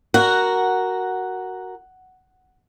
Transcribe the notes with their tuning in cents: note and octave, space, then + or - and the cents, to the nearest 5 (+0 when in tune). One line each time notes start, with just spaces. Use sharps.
F#4 +5 A#4 +0 F#5 +0